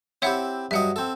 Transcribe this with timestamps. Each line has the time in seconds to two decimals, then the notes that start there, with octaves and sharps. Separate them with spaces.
0.22 C4 E4 G4 C#5 E5 F#5
0.71 G2 F#3 D#5 E5 F#5
0.96 C4 A4